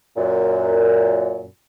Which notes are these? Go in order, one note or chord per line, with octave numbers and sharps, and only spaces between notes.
F#2 A#2